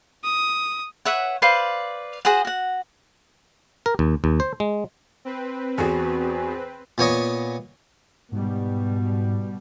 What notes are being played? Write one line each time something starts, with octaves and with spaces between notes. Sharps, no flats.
D#6
B4 C#5 E5 F#5
B4 C5 D5 F5
F#4 G#4 C5 F#5
F#4 F#5
A#4
D#2
D#2
C5
G#3
C4 B4
E2 F#4 G#4
A#2 B3 C#5 D#5
G#2 B2 G3